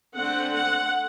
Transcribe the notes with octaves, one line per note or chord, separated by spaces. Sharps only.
D3 A3 C4 F#5
F#5